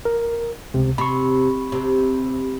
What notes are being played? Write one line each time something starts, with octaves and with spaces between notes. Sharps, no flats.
A#4
C#2 C3
C3 B5 C#6
C3